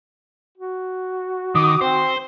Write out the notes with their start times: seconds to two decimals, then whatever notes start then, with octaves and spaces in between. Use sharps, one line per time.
0.58 F#4
1.55 D#3 D6 D#6
1.81 C4 C5